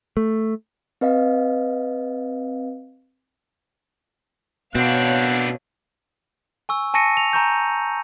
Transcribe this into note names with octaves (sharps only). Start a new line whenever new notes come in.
A3
C4 B4 D#5 F5
B2 B3 C4 D4 C#5 F5 F#6
G#5 C#6 E6
G#5 A5 C#6 A#6 C#7 D#7
F7
G#5 A#5 C#6 G6